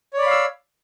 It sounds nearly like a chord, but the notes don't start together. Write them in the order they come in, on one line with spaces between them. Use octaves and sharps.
C#5 D5 B5 F5 E6